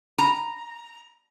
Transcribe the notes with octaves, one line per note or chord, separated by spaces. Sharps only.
A#5